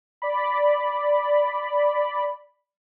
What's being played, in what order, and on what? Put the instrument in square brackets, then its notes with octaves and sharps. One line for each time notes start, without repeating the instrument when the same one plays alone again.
[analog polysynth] D5 B5